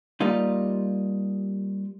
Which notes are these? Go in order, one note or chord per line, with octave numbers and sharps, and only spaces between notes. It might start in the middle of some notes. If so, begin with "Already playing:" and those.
G3 A#3 D#4 F4